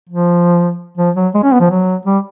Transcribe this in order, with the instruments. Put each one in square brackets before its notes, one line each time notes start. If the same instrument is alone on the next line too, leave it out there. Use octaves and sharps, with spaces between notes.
[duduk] F3
F3
F#3
G#3
C#4
B3
F3
F#3
G3